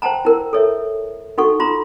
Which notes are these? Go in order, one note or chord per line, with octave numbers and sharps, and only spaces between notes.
C5 F#5 G5 A5 A#5
E4 A#4
A4 C#5 E5
D#4 F#4 A4 F#5 C#6
F4 A#5 C6